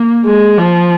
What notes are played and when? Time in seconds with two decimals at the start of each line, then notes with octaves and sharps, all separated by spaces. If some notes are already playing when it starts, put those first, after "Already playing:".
Already playing: A#3
0.25 G#3
0.58 F3